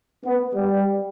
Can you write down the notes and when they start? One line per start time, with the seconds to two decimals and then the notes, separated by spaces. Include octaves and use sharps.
0.24 B3
0.54 G3